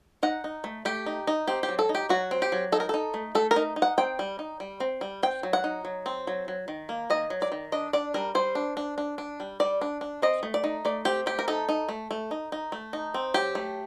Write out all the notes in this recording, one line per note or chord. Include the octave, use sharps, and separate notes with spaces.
D#4 F#5
D#4
A3
A3 G4
D#4
D#4
C4 G4
G4
F#3
A4
D#4
G4
F#3 F#4
C4
G4
F#3
D#4 A4
A#4
D#4 A4
A3
A3 A4
A#4
D#4
D#4
F#5
C4 G5
G3
D#4
G3
C4
G3
C4 G5
F#3
F#5
D#4
F#3
C4
F#3
F#3
D#3
A#3
D#3 D#5
F#3
D5
D#3
D4 D#5
D4 D5
G3 A#4
G3 C5
D4
D4
D4
D4
G3
G3 D5
D4
D4
C4 D#5
A3
D5
D#4
A3 D5
C4 G4
A3 G4
A#4
D#4 A4
D#4
A3
A3
D#4
D#4
A3
D#4
C4
F#3 G4
A3